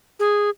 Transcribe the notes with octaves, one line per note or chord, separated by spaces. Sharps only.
G#4